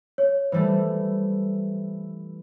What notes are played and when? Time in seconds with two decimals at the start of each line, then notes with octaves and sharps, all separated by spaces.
0.18 C#5
0.52 E3 G3 A3 C5